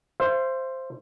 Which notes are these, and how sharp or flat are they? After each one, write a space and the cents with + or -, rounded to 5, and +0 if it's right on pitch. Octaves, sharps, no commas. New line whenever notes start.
C5 +0 E5 +45